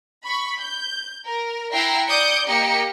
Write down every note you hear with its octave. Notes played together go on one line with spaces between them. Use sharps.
B5 C#6
G6
A#4
E4 E5 F#5 G5 A#5 C7
D5 D6 D#6 G6 C#7 D7
A#3 G4 D#5 C#7